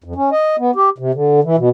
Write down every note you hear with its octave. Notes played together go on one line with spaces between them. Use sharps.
F2
C#4
D#5
B3
G4
C3
D3
E3
B2